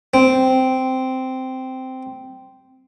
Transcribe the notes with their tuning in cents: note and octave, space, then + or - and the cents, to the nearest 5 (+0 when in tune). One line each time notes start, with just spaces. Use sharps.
C4 -10